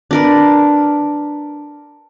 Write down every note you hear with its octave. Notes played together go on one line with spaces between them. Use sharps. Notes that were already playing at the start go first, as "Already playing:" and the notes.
D4 A#4 B4